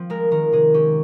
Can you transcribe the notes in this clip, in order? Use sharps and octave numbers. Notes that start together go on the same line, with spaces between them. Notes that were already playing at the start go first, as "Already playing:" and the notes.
Already playing: F3 C4
G#3 A#4
D#3 A#4
C3 G#4
C#4 G4